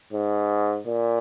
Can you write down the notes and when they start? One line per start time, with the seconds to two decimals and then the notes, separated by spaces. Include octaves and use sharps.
0.13 G#2
0.87 A#2